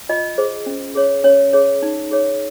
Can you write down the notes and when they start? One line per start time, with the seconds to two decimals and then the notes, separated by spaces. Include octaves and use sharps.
0.09 F4 D#5
0.38 G#4 C5
0.66 C#4
0.95 G#4 C#5
1.24 C#4 C#5
1.53 G#4 C#5
1.82 D#4
2.11 G#4 C#5